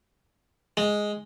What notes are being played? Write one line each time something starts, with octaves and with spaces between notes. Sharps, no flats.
G#3